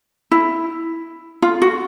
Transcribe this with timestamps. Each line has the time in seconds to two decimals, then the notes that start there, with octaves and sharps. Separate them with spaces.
0.31 E4
1.42 F4
1.62 F#4